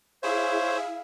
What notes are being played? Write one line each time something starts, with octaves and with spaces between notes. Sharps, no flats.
E4 G#4 C5 C#5 E5 F5